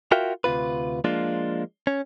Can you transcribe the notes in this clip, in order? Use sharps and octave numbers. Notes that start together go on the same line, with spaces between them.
F4 F#4 A#4 E5 F5 G5
D2 C3 F4 B4
F3 G#3 A#3 D4 F4
C#4